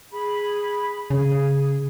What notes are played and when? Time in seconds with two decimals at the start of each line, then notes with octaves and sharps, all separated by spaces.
0.12 G#4 B5
1.10 C#3 G#4